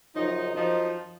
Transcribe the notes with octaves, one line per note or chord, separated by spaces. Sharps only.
F#2 C#3 F3 D#4
F#2 F3 D#4